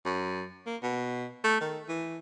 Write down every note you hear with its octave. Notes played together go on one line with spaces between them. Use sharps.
F#2
A#3
B2
A3
D#3
E3